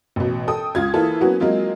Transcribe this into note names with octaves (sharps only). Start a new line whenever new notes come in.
A1 B2
A4 G5 D#6
C#2 F4 G#6
E3 A#3 E4 F4 A4
F#3 A#3 B3 C#4 F#4
F#3 G#3 A#3 C4 F4